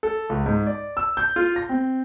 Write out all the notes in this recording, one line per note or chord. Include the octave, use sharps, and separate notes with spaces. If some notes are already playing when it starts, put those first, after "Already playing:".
A4
C#2
G#2
D5
E6
G6
F4
A#6
C4